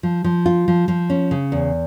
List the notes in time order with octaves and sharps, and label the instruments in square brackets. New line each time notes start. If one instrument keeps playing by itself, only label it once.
[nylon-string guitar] F3
F3
F4
F3
F3
C#4
C#3
E2